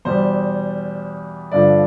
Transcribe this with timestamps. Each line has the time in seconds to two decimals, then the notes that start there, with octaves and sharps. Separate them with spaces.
0.05 E2 B2 G3 C5
1.52 G2 D3 F3 D5